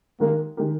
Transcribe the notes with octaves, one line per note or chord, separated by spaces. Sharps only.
D#3 G#3 A#3 D#4 G4 A#4
D#3 G#3 D#4 G4 A#4